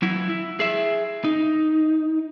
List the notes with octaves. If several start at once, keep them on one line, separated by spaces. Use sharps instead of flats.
F#3 E4
E4
G#4 E5
D#4